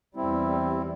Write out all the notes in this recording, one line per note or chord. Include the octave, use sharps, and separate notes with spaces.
E2 G3 C4 E4